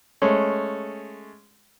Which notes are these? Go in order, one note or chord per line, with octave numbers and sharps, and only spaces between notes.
G#3 A3 C#4